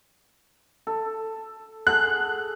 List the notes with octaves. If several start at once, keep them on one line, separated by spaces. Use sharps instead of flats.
A4
G#4 A4 F#5 F#6